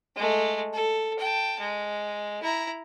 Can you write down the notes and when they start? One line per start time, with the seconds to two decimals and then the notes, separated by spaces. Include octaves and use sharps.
0.16 G#3 A3
0.73 A4
1.19 G5 A5
1.60 G#3
2.43 E4 A#5